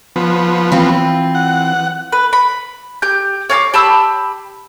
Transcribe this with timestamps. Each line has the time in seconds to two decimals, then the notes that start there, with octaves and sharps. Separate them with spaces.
0.16 F3 B3
0.72 E3 C4 F4
1.35 F#5
2.12 B4
2.33 B5
3.02 G4 G6
3.50 C#5 F5 A5 D6
3.74 G4 A5 B5 E6